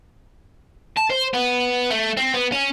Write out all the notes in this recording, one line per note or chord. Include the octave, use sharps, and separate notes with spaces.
A5
C5
B3
A3
C4
B3
C#4